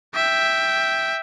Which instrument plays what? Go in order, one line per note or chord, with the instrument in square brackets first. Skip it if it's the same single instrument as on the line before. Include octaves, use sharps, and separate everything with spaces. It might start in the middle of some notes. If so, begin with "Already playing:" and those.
[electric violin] E5 G5